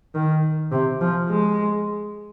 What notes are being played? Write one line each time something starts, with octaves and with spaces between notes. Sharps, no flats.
D#3
C3
F3
G#3